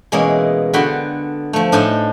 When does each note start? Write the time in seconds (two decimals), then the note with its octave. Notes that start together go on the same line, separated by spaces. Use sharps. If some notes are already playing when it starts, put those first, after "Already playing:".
0.12 B2 E3 G#3 A#3 C#4 G#4
0.73 D3 B3 F#4 G5 B5 C6
1.53 F3 A3
1.72 A2 D4 D#4 A4 C5 G#5